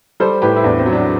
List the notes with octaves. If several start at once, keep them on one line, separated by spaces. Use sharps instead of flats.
G3 A4 C5
A2 G4 B4
E4
E2 D4
C4
F#3
D4